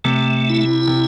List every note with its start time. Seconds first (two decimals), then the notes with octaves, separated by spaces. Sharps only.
0.04 C3 A3
0.50 E4
0.87 C3